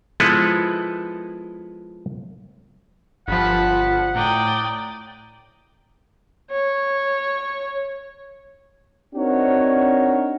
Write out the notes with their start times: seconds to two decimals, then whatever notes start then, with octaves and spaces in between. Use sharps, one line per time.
0.20 F3 G#3 B3 E4 A4 B4
3.28 G1 F3 F#5 A5 B5
4.15 A2 D5 G5 A#5 D#6
6.51 C#5
9.15 C4 D4 D#4 F#4 A#4 C#5